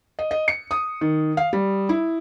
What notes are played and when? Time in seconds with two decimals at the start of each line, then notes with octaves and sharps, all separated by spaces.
0.19 D#5
0.31 D#5
0.48 C#7
0.71 D#6
1.01 D#3
1.37 F5
1.53 G3
1.89 E4